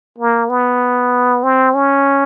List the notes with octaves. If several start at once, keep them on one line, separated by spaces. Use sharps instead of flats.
A#3
B3
C4
C#4